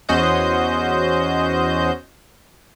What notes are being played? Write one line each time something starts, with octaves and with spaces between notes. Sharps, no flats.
E2 C#4 F#4 C5 D#5 G6